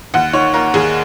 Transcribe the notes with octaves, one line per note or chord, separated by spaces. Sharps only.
D#2 F#5
D#3 C#5
A#3 A#4
D#2 G#4